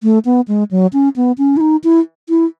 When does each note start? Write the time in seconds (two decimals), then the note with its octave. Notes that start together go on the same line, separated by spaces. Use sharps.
0.03 A3
0.25 B3
0.48 G#3
0.71 F#3
0.93 C#4
1.16 B3
1.38 C#4
1.57 E4
1.61 D#4
1.84 E4
2.29 E4